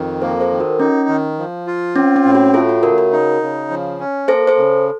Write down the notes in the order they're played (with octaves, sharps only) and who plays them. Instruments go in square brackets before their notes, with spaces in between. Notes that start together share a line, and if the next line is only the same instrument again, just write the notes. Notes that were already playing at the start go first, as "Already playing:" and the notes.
Already playing: [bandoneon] F2 D#3
[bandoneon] A#3 [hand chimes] A4 C5
[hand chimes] A4 C5
[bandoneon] D#3
[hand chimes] F#4 A#4
[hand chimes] C#4 [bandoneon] D#4
[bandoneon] D#3
F3
F4
[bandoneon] C4 [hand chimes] C#4
[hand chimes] C#4
[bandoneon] A2
[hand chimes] F#4
[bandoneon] A3 [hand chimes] F4 A4
[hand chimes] F#4
[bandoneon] C#3 [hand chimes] F#4 A#4
[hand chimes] F#4 A#4
[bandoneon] D#4
C#3
F3
C#4
[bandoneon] A#3 [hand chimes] A4 C5
[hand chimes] A4 C5
[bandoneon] C#3